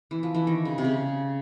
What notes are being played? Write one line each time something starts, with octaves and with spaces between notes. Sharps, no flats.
E3
F3
E3
D#3
C#3
C3
C#3